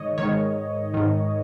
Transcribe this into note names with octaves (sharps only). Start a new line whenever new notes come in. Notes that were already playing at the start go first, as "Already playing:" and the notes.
Already playing: G#2 D#3 C#5 D#5
G#2 D#3 C#5
G#2 D#3